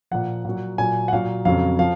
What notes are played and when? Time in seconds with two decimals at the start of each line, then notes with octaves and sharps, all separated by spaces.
0.11 A#2 F3 F#5
0.45 A#2 F#3
0.78 A#2 F#3 G#5
1.08 F#5
1.13 A#2 F#3 F5
1.45 F2 C#3 F#3 F5
1.79 F3 F5